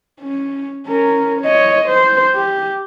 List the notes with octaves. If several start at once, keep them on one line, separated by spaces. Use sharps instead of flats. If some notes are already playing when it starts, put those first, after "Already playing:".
C#4
C#4 A#4
C#5 D#5
C5
G4